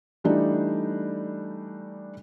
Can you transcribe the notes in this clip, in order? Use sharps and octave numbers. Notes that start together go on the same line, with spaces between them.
E3 G3 A3 D4 D#4